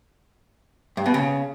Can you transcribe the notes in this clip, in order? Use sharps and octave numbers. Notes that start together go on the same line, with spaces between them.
G2
B2
C#3